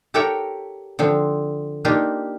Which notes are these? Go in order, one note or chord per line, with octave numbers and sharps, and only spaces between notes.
G4 A4 A#4 C#5 F#5 G5
D3 F3 C4
A#3 D4 D#4 F4 G4